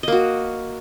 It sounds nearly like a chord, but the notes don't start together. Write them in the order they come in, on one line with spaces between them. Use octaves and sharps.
D#5 A#3 F#4